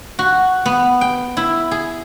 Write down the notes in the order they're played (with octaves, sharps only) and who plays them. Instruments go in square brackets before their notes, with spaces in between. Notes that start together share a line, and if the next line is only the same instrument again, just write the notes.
[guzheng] F#4
B3
G5
E4
G#4